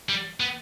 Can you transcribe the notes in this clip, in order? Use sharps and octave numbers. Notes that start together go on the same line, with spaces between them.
G3
B3